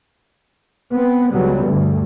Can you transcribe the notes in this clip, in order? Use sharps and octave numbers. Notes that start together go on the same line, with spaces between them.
B3 C4
C#2 F#3 G3 B3
D2 G2